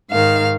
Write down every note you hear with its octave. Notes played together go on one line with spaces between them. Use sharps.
G#2 D#3 F5